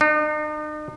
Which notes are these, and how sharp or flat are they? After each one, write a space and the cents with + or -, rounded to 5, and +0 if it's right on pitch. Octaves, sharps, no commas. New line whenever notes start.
D#4 -45